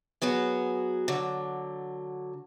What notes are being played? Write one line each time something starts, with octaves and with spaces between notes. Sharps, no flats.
F#3 B3 F#4 G#4
D3 F#3